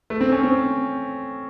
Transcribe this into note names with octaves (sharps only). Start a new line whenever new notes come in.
A3
C4
C#4
C4